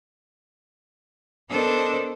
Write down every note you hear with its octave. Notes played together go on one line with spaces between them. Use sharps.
B3 D4 A4 A#4 C5 D#5